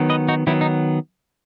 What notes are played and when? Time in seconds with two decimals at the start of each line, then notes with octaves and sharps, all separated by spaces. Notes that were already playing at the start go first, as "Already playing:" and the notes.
Already playing: D#3 F#3 B3
0.10 B4 D#5
0.28 D#4 F#4
0.47 D#3 F#3 B3 E4
0.61 D#4